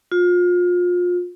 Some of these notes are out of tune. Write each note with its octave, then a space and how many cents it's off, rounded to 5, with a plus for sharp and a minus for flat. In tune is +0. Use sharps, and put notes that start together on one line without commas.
F4 +30